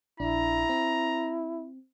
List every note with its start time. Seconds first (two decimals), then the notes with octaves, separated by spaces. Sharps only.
0.20 A#1 D4 E4 A#5
0.69 C4